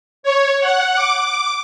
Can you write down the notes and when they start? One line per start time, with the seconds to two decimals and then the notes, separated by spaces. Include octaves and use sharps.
0.23 C#5
0.61 F#5
0.95 D6